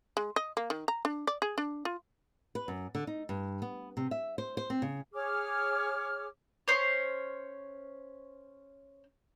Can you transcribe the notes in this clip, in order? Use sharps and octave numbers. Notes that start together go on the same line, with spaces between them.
G#3
D#5
A#3
D#3
A#5
D4
D5
G#4
D4
F4
B4
F#2
D3
D#4
G2
B3
C3
E5
C5
C5
C4
C#3
G#4 C#5 D6 F6
C#4 C5 C#5